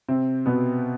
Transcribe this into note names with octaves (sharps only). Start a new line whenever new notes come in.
C3 C4
B2 B3